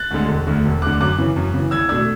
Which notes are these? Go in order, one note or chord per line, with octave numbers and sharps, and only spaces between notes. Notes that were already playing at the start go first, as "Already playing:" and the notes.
Already playing: F#6 A6
D2 D3 G#3
E1
D2 D3
E1
D2 D3 D6 F#6
F#2 D6 F#6
C#3 E3
F#2
C#3 E3
E2 E6 G#6
B2 A3 D4 E6 G#6